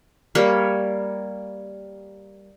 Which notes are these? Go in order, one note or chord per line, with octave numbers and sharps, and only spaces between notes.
G3 A#3 C#5